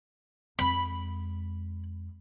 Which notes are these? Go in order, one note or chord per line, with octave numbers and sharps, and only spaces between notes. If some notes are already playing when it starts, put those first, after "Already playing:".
F2 G#3 B5